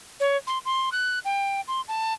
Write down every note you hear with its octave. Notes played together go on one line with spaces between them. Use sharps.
C#5
C6
C6
F#6
G5
C6
A5